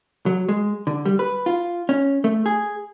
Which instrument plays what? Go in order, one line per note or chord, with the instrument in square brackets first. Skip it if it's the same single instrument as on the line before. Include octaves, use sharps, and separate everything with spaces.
[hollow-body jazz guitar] F#3
G#3
D3
G3
B4
F4
C#4
A3
G#4